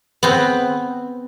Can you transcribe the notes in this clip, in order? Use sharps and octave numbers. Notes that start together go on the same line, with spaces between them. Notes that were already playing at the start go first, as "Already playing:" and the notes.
B3 C4